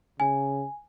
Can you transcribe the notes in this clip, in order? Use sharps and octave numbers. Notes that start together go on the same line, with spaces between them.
C#3 G#5